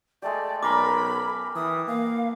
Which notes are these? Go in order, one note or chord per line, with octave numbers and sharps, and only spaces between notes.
G#3 A3 G4 D5
B1 C#4 A#4 B5 C6 D6
E3 D#6
A#3 F5